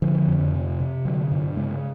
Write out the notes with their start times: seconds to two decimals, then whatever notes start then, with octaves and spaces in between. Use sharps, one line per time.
0.02 D3 F3
0.28 F2
0.54 C3
0.80 C3
1.05 D3 F#3
1.31 G2
1.57 C#3 G#3